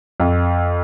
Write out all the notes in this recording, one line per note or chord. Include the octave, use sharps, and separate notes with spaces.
F2